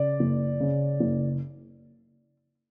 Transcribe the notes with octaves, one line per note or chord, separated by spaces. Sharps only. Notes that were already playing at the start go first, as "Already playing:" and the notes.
Already playing: C#3 D5
F#1
C#3
F#1